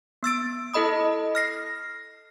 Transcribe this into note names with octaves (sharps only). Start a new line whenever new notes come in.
B3 E6 A6 D7
E4 A4 D#5 B5 D#6
F6 A#6 C7